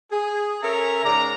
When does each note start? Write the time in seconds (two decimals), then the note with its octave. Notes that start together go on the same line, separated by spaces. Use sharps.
0.12 G#4
0.63 C#4 A4 A#4 C#5 E5 A#5
1.04 G#2 C#3 D5 A#5